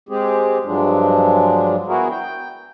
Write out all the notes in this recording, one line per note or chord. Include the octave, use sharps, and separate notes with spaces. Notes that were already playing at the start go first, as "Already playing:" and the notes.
G#3 C4 G4 G#4
G2 F3 F#3 G#3 D4
B3 E4 F#4 G#4 A#4
G5